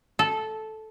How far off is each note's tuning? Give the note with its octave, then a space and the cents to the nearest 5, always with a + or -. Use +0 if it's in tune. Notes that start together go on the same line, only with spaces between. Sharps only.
A4 -10